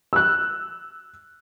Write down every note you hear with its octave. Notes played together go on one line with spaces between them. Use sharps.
E6 F#6